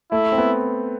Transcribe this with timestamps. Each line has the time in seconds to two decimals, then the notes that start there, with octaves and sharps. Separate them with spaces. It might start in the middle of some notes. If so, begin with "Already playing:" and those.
0.12 A3 E4
0.32 C4
0.38 B3